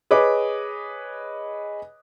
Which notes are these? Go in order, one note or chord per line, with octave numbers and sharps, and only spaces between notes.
G#4 B4 C#5 D#5 D6